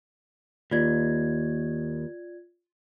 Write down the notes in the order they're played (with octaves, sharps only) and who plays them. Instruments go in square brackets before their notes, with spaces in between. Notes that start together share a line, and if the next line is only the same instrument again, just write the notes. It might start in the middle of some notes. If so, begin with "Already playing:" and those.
[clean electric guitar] D#2 [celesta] F4 D5 G#6